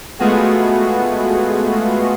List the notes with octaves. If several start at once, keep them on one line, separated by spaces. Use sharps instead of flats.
G#3 A3 B3 F4 F#4 G#4